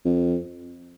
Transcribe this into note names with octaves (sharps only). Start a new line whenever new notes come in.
F2